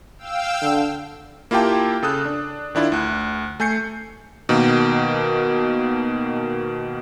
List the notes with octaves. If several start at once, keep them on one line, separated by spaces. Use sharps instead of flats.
F5 G5 E6
D3
A#3 E4 F4 G4 G5 A5
C#3 A4 D#6 F#6
D4
D#3 D4 E4 F4
D2 F#6
A3 G#5 G6 C7 C#7
B2 D#3 A#3